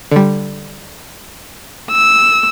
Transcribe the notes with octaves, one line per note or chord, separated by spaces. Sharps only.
D3 G3
E6